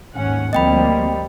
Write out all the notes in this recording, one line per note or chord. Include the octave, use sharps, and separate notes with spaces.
D#2 G#2 C#4 F#5
D2 F3 G3 A#3 C4 D#5 G5 B5